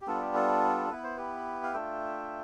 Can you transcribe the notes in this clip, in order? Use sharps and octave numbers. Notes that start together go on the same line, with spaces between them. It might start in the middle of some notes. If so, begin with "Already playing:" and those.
G4
G3 B3 D4 F4 A4
G4
A4
B3 E4 B4
C5
G4 B4
F5
A3 D4 F4 E5 G5